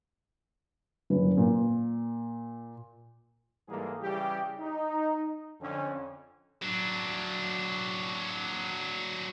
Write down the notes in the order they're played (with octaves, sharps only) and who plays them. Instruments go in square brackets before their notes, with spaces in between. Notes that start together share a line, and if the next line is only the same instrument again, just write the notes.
[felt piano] F#1 B4
A#2
[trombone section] G#2 E3 G3 A#3 G#4 A4
C#3 E3 G3 G4
D#4
F2 D3 C#4
[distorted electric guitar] F#3 D4